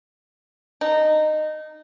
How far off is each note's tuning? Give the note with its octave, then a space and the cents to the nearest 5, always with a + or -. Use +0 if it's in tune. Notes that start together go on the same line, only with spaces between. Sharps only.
D#4 -15